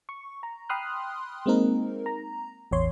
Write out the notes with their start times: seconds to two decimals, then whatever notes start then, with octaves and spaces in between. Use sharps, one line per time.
0.09 C#6
0.43 A#5
0.69 G5 B5 C6 D#6 F6 F#6
1.46 G#3 A#3 C4 D#4 A#4
2.06 A#5
2.71 A1 E2 C#5 C6